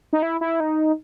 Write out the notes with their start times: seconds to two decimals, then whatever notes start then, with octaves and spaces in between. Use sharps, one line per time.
0.13 D#4
0.22 E4
0.41 E4
0.60 D#4